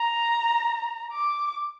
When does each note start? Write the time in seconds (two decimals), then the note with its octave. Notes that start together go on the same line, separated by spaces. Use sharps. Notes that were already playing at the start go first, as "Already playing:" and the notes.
Already playing: A#5
1.12 D6